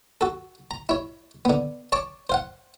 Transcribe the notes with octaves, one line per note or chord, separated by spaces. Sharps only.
F#4 A4
A#5
E4 C#5
D3 B3
C#5 A5 C#6 D6
C5 F5 F#5